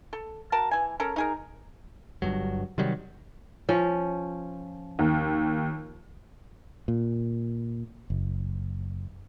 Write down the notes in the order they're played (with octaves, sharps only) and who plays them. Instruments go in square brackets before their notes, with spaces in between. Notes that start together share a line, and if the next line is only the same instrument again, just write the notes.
[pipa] A4
F#4 A#4 A5
E3 G#5
C#4 A4 A#4
D#4 G#4 A#4
[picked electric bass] G1 G2 F#3
C3 D#3 F#3 G3
[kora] F3 C#4
[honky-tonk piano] D#2
[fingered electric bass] A#2
F#1